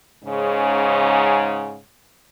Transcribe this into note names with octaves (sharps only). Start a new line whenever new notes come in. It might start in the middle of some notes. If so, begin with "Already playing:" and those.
G#2 C#3